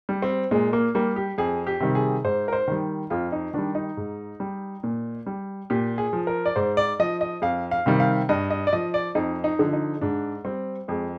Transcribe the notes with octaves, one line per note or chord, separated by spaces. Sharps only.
G3
C4
A#2 G#3
A#3
G3 A#3
G4
F2 G#4
G4
C3 D#3 G3
G#4
G#2 C5
A#4
C5
D#3 G3
F2 F4
D#4
D#3 G3 D4
D#4
G#2
G3
A#2
G3
A#2 G4
G#4
F3
A#4
D5
G#2 C5
D5
F3 D#5
D#5
F2 F5
F5
C3 D#3 G3
F5
G2 D#5
D#5
D5
F3 D#5
D5
F2 D#4
D#4
D3 F3
D#4
G#2 D4
G3 C4
F2 G#3